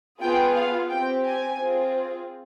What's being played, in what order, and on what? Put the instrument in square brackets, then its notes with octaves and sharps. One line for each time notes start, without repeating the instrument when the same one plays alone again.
[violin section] B3 F4 G#4 G5
F5
C4 G4 G5
G#5
C4 F4 G#4